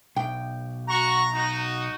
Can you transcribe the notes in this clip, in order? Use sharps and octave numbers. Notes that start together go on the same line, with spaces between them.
B1 G5
F#4 A#5 C#6
D#4 F#4